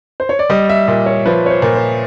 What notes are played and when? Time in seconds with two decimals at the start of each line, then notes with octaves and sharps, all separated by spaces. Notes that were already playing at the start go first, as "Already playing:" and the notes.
0.20 C5
0.29 C#5
0.39 D5
0.50 G3 D#5
0.69 E5
0.87 A#2 D#5
1.06 C#5
1.26 F3 B4
1.46 C#5
1.50 C5
1.62 A#2
1.75 C5